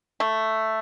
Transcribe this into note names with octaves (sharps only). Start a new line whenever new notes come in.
A3